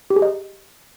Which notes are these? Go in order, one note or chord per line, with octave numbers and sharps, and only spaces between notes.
G4
G#4
D#5